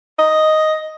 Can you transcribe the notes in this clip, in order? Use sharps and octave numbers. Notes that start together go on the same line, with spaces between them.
D#5